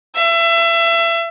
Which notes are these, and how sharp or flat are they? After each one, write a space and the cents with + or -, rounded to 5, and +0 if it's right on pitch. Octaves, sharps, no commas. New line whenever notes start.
E5 +30